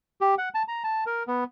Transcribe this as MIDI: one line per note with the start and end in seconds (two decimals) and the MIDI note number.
0.21 0.35 67
0.38 0.49 78
0.54 0.63 81
0.68 0.83 82
0.84 1.04 81
1.06 1.23 70
1.27 1.44 59